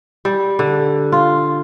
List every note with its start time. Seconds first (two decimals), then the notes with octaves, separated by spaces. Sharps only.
0.25 G3
0.59 D3
1.12 F4